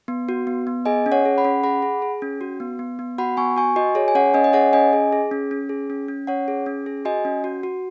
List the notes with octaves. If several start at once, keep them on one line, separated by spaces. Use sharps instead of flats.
B3
F#4
B3
B3
G#4 D#5 G#5
C#4
C#5 F#5
G#4
F#5 B5
C#4
G#4 F#5 B5
G#4
G#4
C#4
F#4
B3
B3
B3
F#4 F#5 B5
B3 G#5 C#6
F#4 G#5 C#6
F#4 D#5 G#5
G#4 C#5
G#5
C#4 C#5 F#5
C#4 D#5 G#5
D#5
G#4 C#5 F#5
C#4 D#5 G#5
G#4
G#4
C#4
C#4
G#4
C#4
C#4
C#4 C#5 F#5
G#4
C#4
G#4
F#4 D#5 G#5
C#4
F#4
F#4